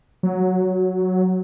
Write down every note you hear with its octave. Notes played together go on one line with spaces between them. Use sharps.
F#3